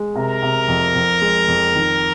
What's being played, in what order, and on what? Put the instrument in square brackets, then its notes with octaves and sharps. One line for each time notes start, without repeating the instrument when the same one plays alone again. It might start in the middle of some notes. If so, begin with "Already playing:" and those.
Already playing: [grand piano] G#3
[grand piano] C3 [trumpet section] A#4
[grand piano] C3
F2
F2
G#3
F2
D#3